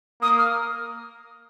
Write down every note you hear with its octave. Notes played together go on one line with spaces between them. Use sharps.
A#3 D#6
F6